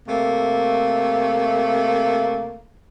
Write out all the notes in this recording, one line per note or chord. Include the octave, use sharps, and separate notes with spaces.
C3 A3 A#3